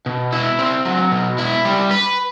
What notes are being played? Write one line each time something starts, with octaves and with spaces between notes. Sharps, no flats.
B2
E4
C4
F#3
B2
E4
G3
B4